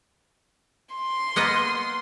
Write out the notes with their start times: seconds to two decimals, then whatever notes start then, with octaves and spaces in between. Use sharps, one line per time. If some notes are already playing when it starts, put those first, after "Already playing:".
0.95 C6
1.36 A#3 B3 D#5